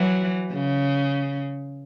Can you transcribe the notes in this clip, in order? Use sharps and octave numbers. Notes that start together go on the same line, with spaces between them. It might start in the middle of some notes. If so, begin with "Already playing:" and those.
Already playing: E3 F#3
C#3